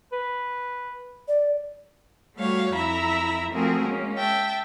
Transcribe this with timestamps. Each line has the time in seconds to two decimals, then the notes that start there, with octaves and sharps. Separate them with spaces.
0.12 B4
1.28 D5
2.34 G3 A3 F#4 C#5 F5
2.73 F2 E4 E5 A#5 B5
3.52 F3 A3 C4 F#4 G#4 A#4
3.85 G#3 A#3 C#4
4.17 E5 G5 A5